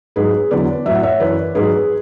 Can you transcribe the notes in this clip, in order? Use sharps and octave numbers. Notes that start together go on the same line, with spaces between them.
G#2 F#3 G#4 B4
E2 D3 F#3 B4 D5
A2 F#3 E5
F#5
C#5 E5
F#2 E3 B4 D5
G#2 F#3 G#4 B4